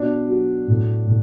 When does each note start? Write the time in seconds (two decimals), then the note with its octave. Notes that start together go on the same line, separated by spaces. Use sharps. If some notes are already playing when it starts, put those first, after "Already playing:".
Already playing: B2 D4
0.28 F#3
0.68 A2
1.07 A2